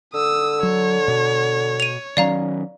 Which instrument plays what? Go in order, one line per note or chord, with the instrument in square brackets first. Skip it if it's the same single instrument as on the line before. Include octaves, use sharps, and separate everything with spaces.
[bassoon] D3 [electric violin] D#6 E6
[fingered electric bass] F#3 [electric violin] C#5
[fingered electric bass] B2
[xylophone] D#7 F7
[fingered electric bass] D#3 F#3 C#4 [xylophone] D5 F5 A#5